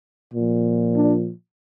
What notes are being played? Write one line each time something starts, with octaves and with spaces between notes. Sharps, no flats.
A#2 F3
D4